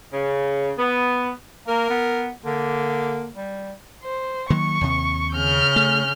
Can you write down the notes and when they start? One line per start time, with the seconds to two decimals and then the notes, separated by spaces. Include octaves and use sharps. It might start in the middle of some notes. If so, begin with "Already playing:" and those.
0.12 C#3
0.79 B3
1.68 A#3 A#4
1.90 B3
2.45 D3 A#3
3.36 G3
4.03 C5
4.50 D#3 F#3 A#3 C#6
4.81 D#2 C3
5.33 C#3 F6 G6
5.76 A3